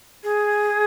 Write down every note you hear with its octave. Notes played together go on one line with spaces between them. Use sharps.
G#4